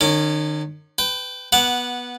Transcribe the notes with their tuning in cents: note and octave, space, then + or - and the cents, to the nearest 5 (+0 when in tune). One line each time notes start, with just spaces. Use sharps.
D#3 -40 C#4 -15 D6 +15
B4 +25 G5 +0
B3 -15 F#5 +0 D6 +0